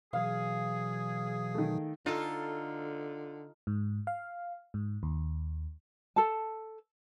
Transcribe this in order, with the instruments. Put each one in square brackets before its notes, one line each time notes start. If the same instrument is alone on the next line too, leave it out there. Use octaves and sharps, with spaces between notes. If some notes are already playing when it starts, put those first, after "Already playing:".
[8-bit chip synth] B2 E3 F#3 [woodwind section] G#4 [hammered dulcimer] F5
[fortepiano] D#3 A3
[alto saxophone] D3 [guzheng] D#4 A4 [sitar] F4
[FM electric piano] G#2
F5
G#2
D#2
[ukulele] A4 A5